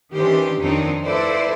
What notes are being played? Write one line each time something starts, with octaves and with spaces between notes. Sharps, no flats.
D#3 E3 C#4 D4 G4 C5
F2 D#3 C4 D4 D#4 C#5
E4 F4 A4 B4 C5 D5